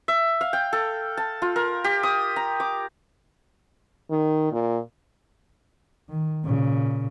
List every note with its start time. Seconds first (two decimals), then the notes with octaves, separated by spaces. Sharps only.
0.08 E5
0.41 F5
0.53 G5
0.73 A4
1.17 A5
1.42 F4
1.56 A#4
1.84 G4
2.03 D#6
2.36 A#5
2.60 D6
4.11 D#3
4.52 A#2
6.10 D#3
6.45 A#2 C#3